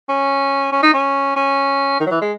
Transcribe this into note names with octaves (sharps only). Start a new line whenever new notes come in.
C#4
C#4
D#4
C#4
C#4
D#3
F#3
E3
G#3